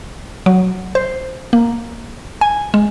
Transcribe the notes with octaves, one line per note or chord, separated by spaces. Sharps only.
F#3
C5
A#3
G#5
G#3